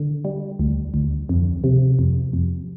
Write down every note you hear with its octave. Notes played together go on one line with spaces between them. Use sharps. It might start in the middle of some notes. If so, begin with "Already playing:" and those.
Already playing: D3
G3
D2
D2
F2
C3
F2
F2